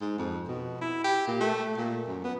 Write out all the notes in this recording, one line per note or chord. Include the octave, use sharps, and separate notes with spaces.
G#2
F2
B2
E4
G4
A#2
A3
A#2
F#2
B3